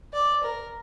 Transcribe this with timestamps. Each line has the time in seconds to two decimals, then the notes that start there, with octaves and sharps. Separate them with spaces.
0.13 D5
0.43 A#4